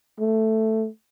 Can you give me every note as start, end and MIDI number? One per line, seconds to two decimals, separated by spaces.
0.19 0.87 57